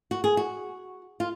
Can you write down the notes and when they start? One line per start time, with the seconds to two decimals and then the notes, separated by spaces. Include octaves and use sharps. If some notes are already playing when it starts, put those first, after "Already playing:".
0.11 F#4
0.24 G#4
0.37 F#4
1.20 F4